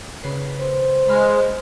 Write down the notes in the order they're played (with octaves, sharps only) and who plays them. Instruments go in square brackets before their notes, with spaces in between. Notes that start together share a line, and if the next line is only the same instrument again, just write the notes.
[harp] C#3 B4 C7
[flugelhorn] C5
[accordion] G#3 [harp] B5 C6 F6